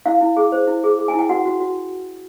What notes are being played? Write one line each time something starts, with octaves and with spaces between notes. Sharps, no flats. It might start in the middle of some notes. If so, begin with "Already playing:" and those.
E4 F5
E4
G#4
C5
E4
G#4
G#4
G#5
E4
G5
F#4 F#5
F#4
F#4